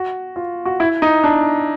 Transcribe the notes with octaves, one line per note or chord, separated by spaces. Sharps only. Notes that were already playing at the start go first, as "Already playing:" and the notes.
Already playing: F#4
F4
F#4
E4
D#4
D4